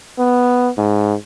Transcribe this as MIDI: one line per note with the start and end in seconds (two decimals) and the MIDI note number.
0.19 0.69 59
0.78 1.14 44